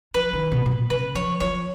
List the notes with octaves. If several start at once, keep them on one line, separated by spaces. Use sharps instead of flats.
F3 B4
D#3
B2
G#2
A#2
C#3 B4
F3 C#5
F3 C#5